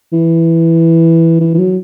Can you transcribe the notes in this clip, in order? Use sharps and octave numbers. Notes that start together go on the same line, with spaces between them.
E3
E3
E3
F#3